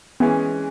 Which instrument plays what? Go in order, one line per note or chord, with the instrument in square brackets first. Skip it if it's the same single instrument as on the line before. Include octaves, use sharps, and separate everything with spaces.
[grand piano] E3 G#3 C#4 G#4 [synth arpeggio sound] B3